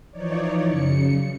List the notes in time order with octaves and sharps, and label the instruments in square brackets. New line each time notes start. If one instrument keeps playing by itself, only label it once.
[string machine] E3 F3 D#4 C#5 D5
F#2 C#3 C#7